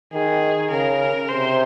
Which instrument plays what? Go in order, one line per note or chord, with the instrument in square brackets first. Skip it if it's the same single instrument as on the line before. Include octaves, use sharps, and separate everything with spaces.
[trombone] D#3 [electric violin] G#4
[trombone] C#3 [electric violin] A#4
[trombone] C3 [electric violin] C5